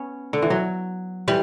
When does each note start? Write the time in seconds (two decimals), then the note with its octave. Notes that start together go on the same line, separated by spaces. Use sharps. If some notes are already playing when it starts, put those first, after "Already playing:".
Already playing: B3 C#4
0.33 D3
0.42 E3
0.50 F#3
1.28 E3 G3